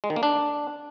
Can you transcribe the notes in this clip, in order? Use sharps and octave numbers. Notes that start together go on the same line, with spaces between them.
G#3
D#3
A#3
D4